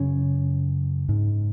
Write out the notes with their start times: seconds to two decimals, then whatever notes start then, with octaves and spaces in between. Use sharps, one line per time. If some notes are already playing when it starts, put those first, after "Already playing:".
Already playing: F#2 C#3 C#4
1.09 G#2